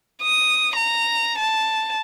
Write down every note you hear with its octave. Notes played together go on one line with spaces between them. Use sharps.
D#6
A#5
A5